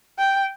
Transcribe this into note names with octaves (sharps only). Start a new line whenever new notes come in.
G5